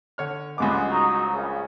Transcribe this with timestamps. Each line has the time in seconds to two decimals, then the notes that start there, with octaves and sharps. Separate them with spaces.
0.18 D3 C#5 F6
0.58 C#2 G2 D3 G#3 B3 D6
0.90 G#2 F#3 D#4
1.33 A#1 C#3